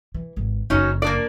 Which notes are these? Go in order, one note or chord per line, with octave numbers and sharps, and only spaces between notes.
E3
G#1 E2
F#1 F2 F#3 C#4 D#4
A#3 D4 D5